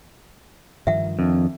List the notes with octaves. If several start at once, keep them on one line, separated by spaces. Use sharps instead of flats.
G2 D#3 F3 E5 F#5
F2 D#3 D4